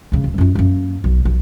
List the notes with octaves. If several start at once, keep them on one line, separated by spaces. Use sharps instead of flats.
C#2 C#3
D1
F#2 F4
F#2 A#3
B1
B1